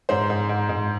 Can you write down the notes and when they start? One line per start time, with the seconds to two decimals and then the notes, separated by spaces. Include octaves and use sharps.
0.09 G#2 C5
0.30 G#2
0.49 G#2
0.69 G#2